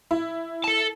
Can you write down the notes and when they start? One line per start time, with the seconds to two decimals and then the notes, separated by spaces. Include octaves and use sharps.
0.11 E4
0.64 A4 A5